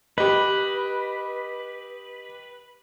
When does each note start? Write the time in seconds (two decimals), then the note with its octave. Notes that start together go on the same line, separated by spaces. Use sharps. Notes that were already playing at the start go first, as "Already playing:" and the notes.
0.18 G4 B4 D#5